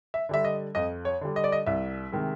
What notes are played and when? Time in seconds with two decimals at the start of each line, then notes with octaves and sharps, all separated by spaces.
0.14 E5
0.29 D3 G3 E5
0.44 D#5
0.75 F2 D#5
1.05 C#5
1.21 D3 G3
1.36 D#5
1.44 D5
1.52 D#5
1.66 C2 E5
2.12 C3 D#3 G#3